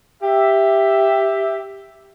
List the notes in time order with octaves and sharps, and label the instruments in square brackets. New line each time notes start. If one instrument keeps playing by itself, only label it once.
[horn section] G4 E5